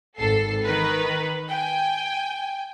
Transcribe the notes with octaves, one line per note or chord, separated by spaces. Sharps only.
G#1 A4 C7
D#3 A#4 B4
G5 G#5